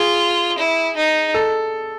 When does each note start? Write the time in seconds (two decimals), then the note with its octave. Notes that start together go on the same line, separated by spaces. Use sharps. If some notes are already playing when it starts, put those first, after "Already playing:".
Already playing: F4 G#4
0.58 E4
0.96 D#4
1.34 A4